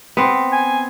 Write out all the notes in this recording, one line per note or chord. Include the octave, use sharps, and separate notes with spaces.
B3 C4
G#5